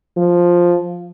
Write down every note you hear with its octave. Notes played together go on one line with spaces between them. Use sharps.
F3